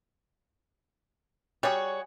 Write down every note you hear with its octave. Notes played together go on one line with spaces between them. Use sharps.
G3 F#4 G#4 C#5 F#5